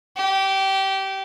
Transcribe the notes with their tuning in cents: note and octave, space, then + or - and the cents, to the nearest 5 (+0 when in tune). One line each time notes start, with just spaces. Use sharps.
G4 -20